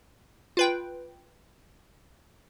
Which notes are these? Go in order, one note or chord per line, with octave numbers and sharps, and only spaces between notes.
F4 B4 G5